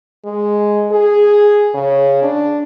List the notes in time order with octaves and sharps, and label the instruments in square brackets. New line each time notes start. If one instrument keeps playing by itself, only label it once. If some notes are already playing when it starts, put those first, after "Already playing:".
[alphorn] G#3
G#4
C#3
D4